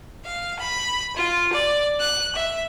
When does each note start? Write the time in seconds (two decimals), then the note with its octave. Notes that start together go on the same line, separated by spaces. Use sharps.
0.24 F5
0.59 B5
1.15 F4
1.52 D5
1.99 F#6
2.35 E5